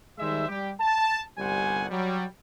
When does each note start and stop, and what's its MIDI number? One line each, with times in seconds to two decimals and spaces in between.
0.19 0.45 51
0.19 0.45 55
0.19 0.45 56
0.19 0.45 72
0.19 0.45 76
0.48 0.71 55
0.48 0.71 67
0.80 1.20 81
1.38 1.86 31
1.38 1.86 36
1.38 1.86 55
1.38 1.86 72
1.38 1.86 78
1.38 1.86 80
1.90 2.24 54
1.90 2.24 55